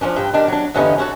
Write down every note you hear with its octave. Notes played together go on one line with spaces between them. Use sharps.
F3 F#3 C#4 D4
G2 G5
D#3 G3 D4
F#3 D4
E2 G2 D3 B3 C#4 D#4
C#4 E4 F#4 A4